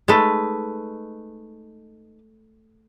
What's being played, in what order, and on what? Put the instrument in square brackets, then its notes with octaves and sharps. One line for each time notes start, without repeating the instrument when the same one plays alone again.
[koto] G#3 A3 [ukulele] D#4 B4